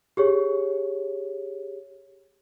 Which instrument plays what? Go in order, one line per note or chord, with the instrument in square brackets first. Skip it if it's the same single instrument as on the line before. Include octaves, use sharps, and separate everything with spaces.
[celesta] G4 G#4 C#5